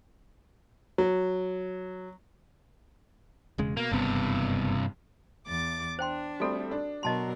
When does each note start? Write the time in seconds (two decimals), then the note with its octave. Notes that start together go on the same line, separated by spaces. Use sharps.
0.98 F#3
3.58 E1 C#3 G#3
3.77 B2 A#3
3.92 F#1 G2 C3 B3
5.47 E2 D6 A6
5.99 D4 C5 G5 C6
6.40 G3 A3 C4 F#4 A4
6.71 D4
7.03 B2 F#3 A#4 D#5 A5 C6